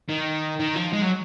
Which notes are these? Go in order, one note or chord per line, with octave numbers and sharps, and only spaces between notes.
D#3
D#3
F3
G#3
F#3